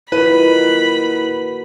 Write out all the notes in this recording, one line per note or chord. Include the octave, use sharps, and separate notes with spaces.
A#2 D#3 F#3 E4 B4 B5